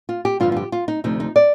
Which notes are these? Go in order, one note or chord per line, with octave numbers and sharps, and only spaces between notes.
F4
G4
G2 D3 F3 F4
F4
G4
F4
D#4
D2 C3 F3 D#4
D#4
D5